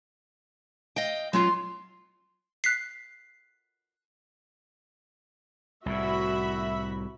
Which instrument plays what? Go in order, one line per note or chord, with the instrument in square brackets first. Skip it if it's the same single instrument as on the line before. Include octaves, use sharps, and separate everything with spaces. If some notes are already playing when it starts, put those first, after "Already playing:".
[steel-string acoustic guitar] D#5 F5 G5
[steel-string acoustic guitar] F#3 C#4 F4 [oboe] C6
[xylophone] F#6 B6 C7
[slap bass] C2 A2 [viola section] F#4 E5 B5